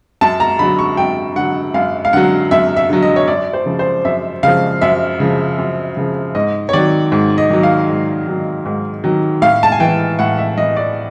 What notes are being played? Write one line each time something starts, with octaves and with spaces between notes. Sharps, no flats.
F#2 A5
A#5
D3 F#3 B5
C#6
F#2 G5
D3 F#3 F#5
F#2 F5
F5
D3 F#3 F#5
F#2 E5
E5
D3 F#3
D#5
C#5
F#2 D5
C5
C#3 F3
C5
F#2 E5
C#3 F3 F5
F#2 E5
C#3 F3
F#2
C#3 F3
G#2 D#5
C#5
D#3 F#3 D5
G#2
D#5
D#3 F#3
F5
G#2
D#3 F#3
G#2
D#3 F#3
A2 F5
A5
G#5
E3 G5
A2 F#5
E5
E3 D#5
D5